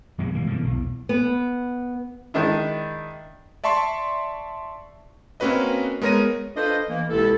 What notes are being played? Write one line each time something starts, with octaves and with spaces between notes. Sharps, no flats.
F#2 B2 F#3 A#3
E3 G3 G#3 A#3
B2 D3 E3
B1 E2
B3
D#3 G#3 D4 E4
D5 E5 A5 C6 C#6
A#3 C4 C#4 F#4 B4 D#5
G#3 B3 A#4 C#5 A#6 D#7
D4 F4 A4 B4 C5 D#5
E3 A#3
C#2 C3 E4 A4